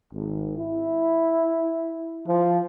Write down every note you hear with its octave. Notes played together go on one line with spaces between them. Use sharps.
G#1
E4
F3